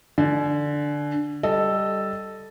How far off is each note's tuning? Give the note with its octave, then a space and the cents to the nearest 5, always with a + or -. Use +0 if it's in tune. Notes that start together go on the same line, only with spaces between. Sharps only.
D3 +0 G#5 +40
G3 +0 A4 +0 D#5 +0